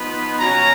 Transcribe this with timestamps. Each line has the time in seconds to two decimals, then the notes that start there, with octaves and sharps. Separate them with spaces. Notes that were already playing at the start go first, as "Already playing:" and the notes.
Already playing: F3 B3 D#4 B5
0.38 B2 F#3 C#4 A#5